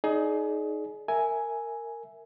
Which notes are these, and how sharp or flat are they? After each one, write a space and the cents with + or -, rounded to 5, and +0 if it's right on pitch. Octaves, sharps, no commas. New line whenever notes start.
D#4 +0 G#4 +30 D5 -20
A#4 -15 E5 +0 G#5 +5